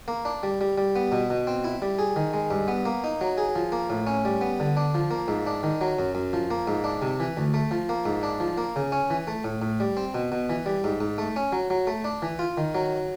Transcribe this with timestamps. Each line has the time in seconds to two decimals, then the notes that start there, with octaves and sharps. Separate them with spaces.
0.08 A#3
0.25 D4
0.43 G3
0.61 G3
0.78 G3
0.96 B3
1.12 B2
1.30 B2
1.47 C4
1.64 E4
1.82 G3
1.99 G#4
2.16 D#3
2.34 G#3
2.51 G2
2.68 B3
2.86 A#3
3.04 D#4
3.21 F#3
3.38 G#4
3.55 F3
3.72 A#3
3.90 A2
4.07 C#4
4.25 G3
4.41 B3
4.60 D3
4.77 D4
4.95 F3
5.11 A#3
5.28 G#2
5.47 D4
5.63 D#3
5.81 F#3
5.99 F#2
6.15 F#2
6.33 F3
6.51 A#3
6.67 G#2
6.84 D4
7.02 C3
7.20 E3
7.37 D2
7.54 A3
7.71 F3
7.89 A#3
8.06 G#2
8.23 D4
8.40 F3
8.58 A#3
8.76 C#3
8.92 C#4
9.10 E3
9.27 A3
9.44 A2
9.62 A2
9.80 G3
9.97 C4
10.14 B2
10.32 B2
10.50 E3
10.66 G3
10.84 G#2
11.01 G#2
11.18 A3
11.36 C#4
11.52 F#3
11.70 F#3
11.87 A3
12.04 D4
12.22 E3
12.39 F4
12.57 D#3
12.75 F#3